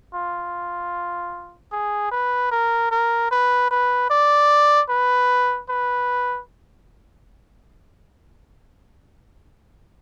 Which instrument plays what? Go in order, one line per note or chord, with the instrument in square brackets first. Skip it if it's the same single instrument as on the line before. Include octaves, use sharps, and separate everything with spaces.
[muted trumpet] F4
G#4
B4
A#4
A#4
B4
B4
D5
B4
B4